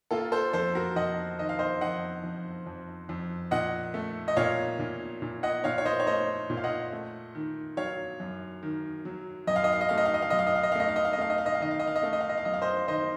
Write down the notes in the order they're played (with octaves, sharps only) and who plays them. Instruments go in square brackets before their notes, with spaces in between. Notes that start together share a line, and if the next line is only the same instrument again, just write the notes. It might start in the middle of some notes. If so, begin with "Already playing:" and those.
[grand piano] A#3 F4 A4
A4 C5
F2 A4 C5
F#4 A#4
F2 D#5 F#5
D#3 D#5
F5
C5 D#5
F2 D#5 F#5
F2
F2
F2
A#2 D#5 F#5
A3
D#5
A#2 C#5 F5
A#2
A#2
D#5 F#5
A#2 C#5 F5
C#5
C5 D#5
C#5
A3 C5 D#5
A#2
F5
D#5 F#5
A3
D#3
F#3 C#5 F5
F#2
D#3
F#3
F#2 D#5
F5
D#5
F5
D#5
A3 F5
D#5
F5
D#5
F5
F#2 D#5
F5
D#5
F5
D#5
F5
A3 D#5
F5
D#5
F5
D#5
A3 F5
D#5
F5
D#5
F5
D#3 D#5
F5
D#5
F5
D#5
A3 F5
D#5
F5
D#5
F5
F#2 D#5
F5
C5 D#5
D#3 C5 D#5